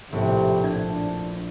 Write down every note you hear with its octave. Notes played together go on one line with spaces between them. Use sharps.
A#1 A2 C3
D4 G#6